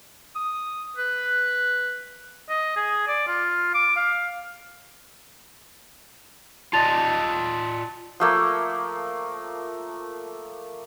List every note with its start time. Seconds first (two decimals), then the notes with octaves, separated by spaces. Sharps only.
0.35 D#6
0.97 B4
2.49 D#5
2.76 G#4
3.08 D5
3.28 F4
3.75 D6
3.96 F5
6.73 F4 D5 D#5 A5 A6 F7
8.20 F3 A3 A#3